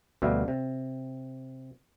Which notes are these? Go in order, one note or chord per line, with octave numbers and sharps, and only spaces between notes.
D2 B2 G3 E5 F5
C3